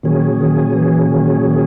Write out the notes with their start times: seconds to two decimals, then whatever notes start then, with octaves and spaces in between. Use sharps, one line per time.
0.03 A#2 D#3 F#3 C#4 G#4
0.40 D#3
0.75 E3
1.11 D#3
1.47 D#3